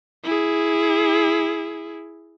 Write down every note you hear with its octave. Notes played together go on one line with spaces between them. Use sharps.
E4 G#4